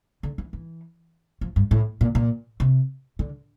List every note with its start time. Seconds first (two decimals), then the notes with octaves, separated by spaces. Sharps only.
0.23 D3
0.38 E3
0.53 E3
1.41 F3
1.56 G2
1.71 A2
2.01 A#2
2.15 A#2
2.60 C3
3.19 D3